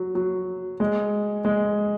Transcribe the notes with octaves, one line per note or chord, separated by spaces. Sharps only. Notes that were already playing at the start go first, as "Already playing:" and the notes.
Already playing: F#3
F#3
G#3
G#3